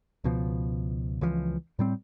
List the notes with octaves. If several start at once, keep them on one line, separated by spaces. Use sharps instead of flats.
C#2 B2 F3
C#2 E3 F3
A2 G3 C4